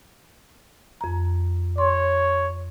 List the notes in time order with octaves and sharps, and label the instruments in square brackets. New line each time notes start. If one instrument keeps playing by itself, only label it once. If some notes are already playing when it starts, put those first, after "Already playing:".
[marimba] F2 A#5
[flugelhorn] C#5 [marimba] C6